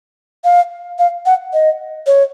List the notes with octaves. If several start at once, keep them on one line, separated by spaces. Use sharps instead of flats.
F5
F5
F#5
D#5
C#5